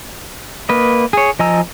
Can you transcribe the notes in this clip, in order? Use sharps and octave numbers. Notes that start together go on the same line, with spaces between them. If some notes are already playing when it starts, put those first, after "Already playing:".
A#3 B4 D#5
G#4 C#5
F3 D#5 G#5 A#5 E6